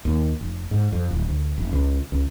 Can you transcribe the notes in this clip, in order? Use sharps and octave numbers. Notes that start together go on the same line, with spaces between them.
D#2
F1
G#2
F2
D1
D2
F1
C#2
C#2